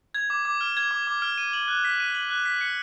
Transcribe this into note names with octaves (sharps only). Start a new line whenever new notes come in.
G#6
D6
D6
F6
G#6
D6
D6
F6
D#7
F#7
F#6
B6
D#7
F#7
F#6
B6
C#7